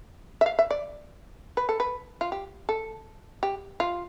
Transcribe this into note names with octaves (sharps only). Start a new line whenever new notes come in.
E5
F5
E5
D5
B4
A4
B4
F4
G4
A4
G4
F4